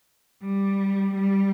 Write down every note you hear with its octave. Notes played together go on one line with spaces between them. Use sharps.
G3
G3